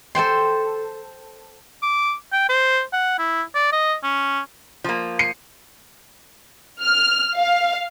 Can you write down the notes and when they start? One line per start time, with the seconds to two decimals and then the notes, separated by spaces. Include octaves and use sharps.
0.15 A4 C5 G5 C6
1.82 D6
2.32 G5
2.49 C5
2.92 F#5
3.18 E4
3.55 D5
3.72 D#5
4.03 C#4
4.84 F3 A#3
5.19 C7 C#7 D#7
6.80 F6
7.37 F5